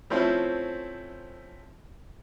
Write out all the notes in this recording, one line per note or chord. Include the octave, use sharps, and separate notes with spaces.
F3 A3 C4 C#4 E4